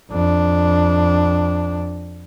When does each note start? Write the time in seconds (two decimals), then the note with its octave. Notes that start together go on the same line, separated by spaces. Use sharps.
0.11 F2 D4